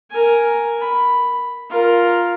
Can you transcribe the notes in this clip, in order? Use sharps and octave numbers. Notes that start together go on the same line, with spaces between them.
A#4 G#5
B5
F4 A#4